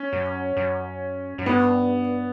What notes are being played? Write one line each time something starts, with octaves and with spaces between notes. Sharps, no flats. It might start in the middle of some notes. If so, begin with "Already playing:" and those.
Already playing: C#4
F#2
F#2
F#2
G2 B3